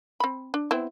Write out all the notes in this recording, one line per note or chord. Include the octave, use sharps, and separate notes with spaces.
C4 B5
D4
B3 C4 E4